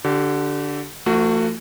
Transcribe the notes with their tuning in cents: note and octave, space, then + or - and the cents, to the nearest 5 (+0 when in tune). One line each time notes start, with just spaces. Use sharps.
D3 -5 G4 -35
F3 -35 A3 +40 F#4 +0